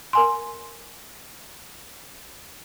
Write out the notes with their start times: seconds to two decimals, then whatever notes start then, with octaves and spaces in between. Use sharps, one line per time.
0.13 A#4 G#5 C6